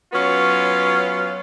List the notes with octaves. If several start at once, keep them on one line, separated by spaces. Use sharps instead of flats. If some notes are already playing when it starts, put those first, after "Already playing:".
F#3 B3 C#4 F4